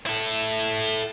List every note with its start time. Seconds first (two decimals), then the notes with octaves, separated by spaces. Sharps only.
0.06 E4 A4